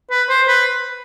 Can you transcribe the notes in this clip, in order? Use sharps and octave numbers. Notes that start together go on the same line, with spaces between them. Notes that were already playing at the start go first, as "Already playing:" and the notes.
B4
C5
B4